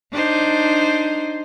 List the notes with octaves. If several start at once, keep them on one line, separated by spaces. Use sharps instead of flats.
D4 D#4 C5